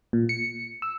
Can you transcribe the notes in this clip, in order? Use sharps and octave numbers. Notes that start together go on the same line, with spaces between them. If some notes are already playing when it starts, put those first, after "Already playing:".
A#2
C#7
E6